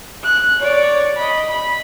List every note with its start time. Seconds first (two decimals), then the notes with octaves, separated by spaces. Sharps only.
0.23 F#6
0.59 C#5 D5
1.16 D#5 B5
1.50 B5